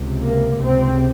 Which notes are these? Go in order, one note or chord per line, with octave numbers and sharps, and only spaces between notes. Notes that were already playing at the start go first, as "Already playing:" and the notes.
Already playing: C#2 C3
A#3
C#2 C3 C4